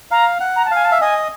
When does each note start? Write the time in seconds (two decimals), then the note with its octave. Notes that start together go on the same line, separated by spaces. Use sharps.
0.11 F5 A#5
0.40 F#5
0.56 A#5
0.65 A5
0.71 F5 G#5
0.84 A5
0.92 E5
1.01 D#5 G#5